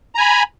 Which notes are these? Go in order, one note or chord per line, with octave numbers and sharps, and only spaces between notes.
G#5 A#5 B5